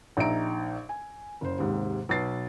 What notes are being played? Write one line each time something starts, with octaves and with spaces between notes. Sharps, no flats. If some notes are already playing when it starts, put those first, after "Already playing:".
A#1 D#4 E5 A#5 D7
G#5
F#1 C5
D#2 G#2 C3
B1 B4 A6 C7